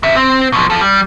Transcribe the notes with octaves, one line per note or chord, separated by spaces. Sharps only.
G#2 E5
C4
B2 F3
F4 A4
G3